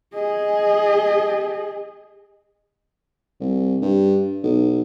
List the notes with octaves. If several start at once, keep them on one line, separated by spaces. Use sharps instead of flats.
G#4 D#5
C2
G2
B1